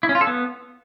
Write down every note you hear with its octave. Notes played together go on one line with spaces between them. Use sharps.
E4
C#4
F4
A4
B3